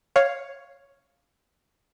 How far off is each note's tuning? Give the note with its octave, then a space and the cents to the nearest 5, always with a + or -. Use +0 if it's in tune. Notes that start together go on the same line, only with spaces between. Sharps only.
C#5 +0 F5 +0